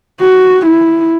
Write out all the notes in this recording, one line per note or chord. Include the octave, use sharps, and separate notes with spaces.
F#4
E4